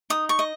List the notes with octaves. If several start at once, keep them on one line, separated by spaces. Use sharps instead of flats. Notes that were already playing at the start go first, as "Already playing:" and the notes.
D#4 D#6
C#6
D#5